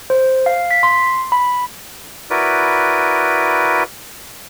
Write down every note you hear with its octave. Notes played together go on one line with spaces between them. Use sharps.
C5
F5
B6
C6
B5
E4 F#4 A#4 B4 D5